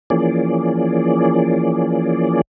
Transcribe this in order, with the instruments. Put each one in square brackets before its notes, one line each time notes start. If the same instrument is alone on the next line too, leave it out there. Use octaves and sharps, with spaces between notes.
[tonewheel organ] E3 F3 A#3 C#4 G#4 D5